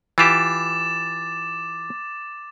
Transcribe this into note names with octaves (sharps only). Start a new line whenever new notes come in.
E3 F4 G4 D6 A6 E7